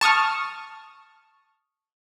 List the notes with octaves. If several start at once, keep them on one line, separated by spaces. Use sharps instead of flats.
A5 C#6 D#6 F6